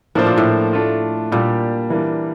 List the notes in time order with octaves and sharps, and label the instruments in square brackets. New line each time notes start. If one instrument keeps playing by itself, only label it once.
[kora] A2 [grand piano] F3 A#3 D4 F4 C5
[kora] A#2
A2
[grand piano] A3 D4 F4
[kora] A#2 [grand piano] G3 A#3 D4 G4
[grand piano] E3 G3 A#3 D4